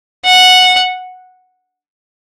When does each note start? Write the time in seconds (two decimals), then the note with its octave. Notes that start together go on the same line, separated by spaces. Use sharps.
0.25 F#5